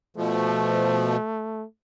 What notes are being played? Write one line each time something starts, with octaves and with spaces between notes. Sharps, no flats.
B2 F3 A3